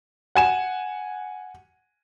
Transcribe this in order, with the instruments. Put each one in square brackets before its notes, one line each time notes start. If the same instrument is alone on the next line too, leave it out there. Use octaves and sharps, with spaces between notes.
[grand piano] F#5 G#5 E7